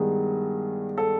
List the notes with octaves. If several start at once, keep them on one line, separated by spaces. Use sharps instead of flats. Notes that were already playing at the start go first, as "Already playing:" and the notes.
Already playing: G2 D#3 G#3 B3 G#4
A4